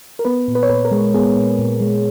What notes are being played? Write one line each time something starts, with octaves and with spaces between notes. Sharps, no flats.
A#4
B3 B4
A#2
B4
C#5
A#2 B4
A#4
G#3
B3 G#4
A#2
A#2
G#3